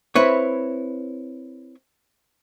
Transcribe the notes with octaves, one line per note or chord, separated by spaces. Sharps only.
C4 E4 B4 C#5